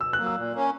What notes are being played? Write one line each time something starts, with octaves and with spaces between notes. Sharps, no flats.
B2 E6
F#3 A#3 F#6
E6
A#2
A#3 C#4